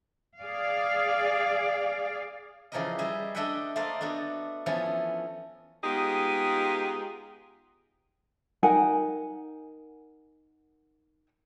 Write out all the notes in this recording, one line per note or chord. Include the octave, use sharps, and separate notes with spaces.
G#4 D5 F5
C#3 E3 F3 G4 A#4 D#5
G3 G#4 D#5 E5
A3 D4 D#5 E5 F#5 G5
A3 A#3 C5 D5 D#5 F5
A3 B3 D4 F#4
E3 F3 A3 B3 C#4
G#3 B3 D#4 F4 G4 G#4
D#4 A#4 F#5 G#5